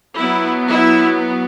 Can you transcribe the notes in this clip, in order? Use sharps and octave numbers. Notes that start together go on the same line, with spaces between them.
F#3 B3 E4
E4